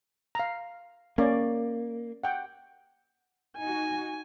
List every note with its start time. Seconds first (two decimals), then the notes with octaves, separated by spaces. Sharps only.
0.35 F5 A#5
1.18 A#3 C#4 D5
2.24 F#5 G5
3.58 D#4 F#4 G#5